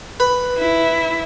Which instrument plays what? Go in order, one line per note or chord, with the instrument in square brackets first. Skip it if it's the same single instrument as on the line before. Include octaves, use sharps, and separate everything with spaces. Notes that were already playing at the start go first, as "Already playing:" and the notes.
[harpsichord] B4
[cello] E4